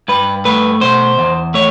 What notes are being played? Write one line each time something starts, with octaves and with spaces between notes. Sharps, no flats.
G2 B4
A3 B4
B2 C5
E2
A3 C#5